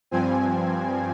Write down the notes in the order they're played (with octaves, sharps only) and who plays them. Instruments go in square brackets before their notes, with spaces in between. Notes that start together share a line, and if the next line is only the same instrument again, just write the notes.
[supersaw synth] G2 F3 C4 G#5